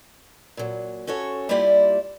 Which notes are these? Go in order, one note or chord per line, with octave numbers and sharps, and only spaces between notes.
A#2 F#3
C#4 F#4 A4 C#5
G3 A#3 E4 F4 G4 D5